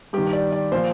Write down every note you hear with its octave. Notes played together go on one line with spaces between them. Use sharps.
G2 D#3 G4
D5
D5
A#2 F3 C5